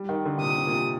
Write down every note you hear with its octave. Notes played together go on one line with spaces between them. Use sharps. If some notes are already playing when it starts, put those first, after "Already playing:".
Already playing: G3
D#3
D3
C3
A#2 D#6
C3
A#2
C3